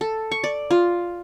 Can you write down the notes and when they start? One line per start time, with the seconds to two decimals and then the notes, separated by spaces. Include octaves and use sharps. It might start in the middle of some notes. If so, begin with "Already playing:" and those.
0.01 A4
0.31 C#6
0.44 D5
0.71 F4